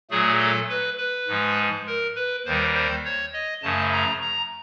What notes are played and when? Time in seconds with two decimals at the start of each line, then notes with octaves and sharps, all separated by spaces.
0.10 A#2 F#3 A3 G#4
0.39 A4
0.70 B4
0.98 B4
1.28 G#2 F3 G#3
1.86 A#4
2.16 B4
2.45 D#2 D#3 G3 C5
2.75 C5
3.05 C#5
3.33 D#5
3.63 F#2 C#3 F3 A3 A5
3.92 A#5
4.21 A#5